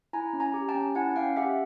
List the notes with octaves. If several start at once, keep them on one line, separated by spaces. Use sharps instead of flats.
E4 G#5 A#5
C#4
G#5 A#5
G4
G5 A5
C#4
E4 F#5 G#5
C#4 F5 G5
G4 E5 F#5